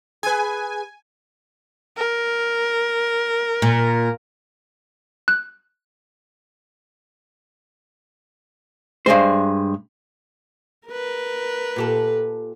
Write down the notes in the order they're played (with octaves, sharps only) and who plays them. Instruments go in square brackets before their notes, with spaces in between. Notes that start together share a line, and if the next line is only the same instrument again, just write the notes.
[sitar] G#4 B4 [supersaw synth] G#5
[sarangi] A#4
[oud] A#2
[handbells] F#6
[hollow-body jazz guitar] G2 A#2 G#3 C5
[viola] A#4 B4
[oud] A#2 G4 A4